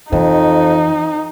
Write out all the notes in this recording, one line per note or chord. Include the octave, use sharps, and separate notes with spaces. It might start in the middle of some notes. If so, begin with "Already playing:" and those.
F2 E3 D#4